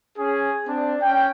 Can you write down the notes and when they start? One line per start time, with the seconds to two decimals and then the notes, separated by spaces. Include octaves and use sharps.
0.17 C#4 G#4
0.66 C4 D4
1.01 C#4 G5